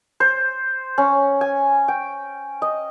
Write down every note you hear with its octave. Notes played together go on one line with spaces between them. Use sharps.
C5
C#4
G#5
G5
D#5